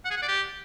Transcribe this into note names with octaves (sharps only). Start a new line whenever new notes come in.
F#5
G#4
F#5
D5
G4